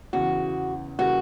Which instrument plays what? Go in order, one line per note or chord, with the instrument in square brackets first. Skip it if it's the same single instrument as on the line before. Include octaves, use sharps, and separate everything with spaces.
[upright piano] E2 C#3 E3 [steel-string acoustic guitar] F#4
[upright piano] C#3 E3 G3 A#3 [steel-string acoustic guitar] F#4